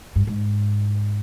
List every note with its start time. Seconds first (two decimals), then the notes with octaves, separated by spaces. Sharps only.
0.16 G2
0.27 G#2